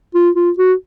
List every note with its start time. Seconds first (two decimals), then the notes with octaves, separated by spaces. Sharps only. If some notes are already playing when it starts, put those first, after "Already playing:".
0.15 F4
0.36 F4
0.58 F#4